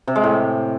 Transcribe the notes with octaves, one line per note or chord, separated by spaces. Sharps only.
C3
G#3
A2